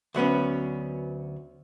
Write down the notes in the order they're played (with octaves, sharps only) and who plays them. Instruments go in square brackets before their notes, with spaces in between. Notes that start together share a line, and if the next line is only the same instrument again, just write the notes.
[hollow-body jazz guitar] D2 F#3 B3 C#4